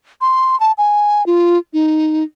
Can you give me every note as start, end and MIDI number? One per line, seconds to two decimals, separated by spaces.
0.21 0.58 84
0.60 0.72 81
0.78 1.26 80
1.26 1.58 65
1.73 2.23 63